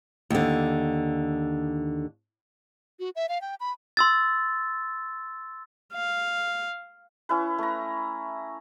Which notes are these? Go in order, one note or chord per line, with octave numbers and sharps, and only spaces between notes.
D#2 D3
F#4
E5
F5
G5
B5
C6 E6 A6
F5
C#4 E4 B4
A3 A#5